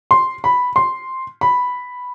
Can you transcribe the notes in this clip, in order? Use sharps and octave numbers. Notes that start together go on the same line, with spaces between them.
C6
B5
C6
B5